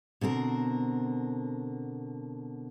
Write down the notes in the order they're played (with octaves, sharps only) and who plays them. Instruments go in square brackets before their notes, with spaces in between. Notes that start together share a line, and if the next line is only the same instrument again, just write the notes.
[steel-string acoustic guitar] B2 D3 C4 A#4